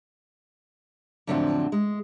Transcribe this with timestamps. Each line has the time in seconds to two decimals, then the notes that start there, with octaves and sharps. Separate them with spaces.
1.27 F2 A2 D3 F3 F#3 C4
1.72 G#3